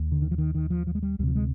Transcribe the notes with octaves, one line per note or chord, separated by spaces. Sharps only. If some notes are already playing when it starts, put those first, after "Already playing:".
Already playing: D#2
D3
D#3
F3
D#3
D#3
F3
F3
G#3
G3
D2 C3 F3 G3
G#3